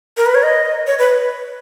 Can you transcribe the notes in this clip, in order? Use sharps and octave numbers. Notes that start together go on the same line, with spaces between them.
A#4
B4
C#5
D#5
C#5
B4